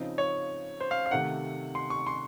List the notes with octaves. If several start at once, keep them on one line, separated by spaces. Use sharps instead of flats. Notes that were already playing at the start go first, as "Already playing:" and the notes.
Already playing: C#3 F3 C4 D#4
C#5
C5
F5
F5
C3 D#3 A3 F#5
C6
C#6
C6